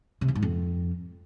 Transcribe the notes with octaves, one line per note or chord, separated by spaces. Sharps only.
C3
E2
G#2
F2